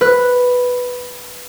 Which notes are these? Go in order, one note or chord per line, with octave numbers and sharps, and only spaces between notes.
B4 F#6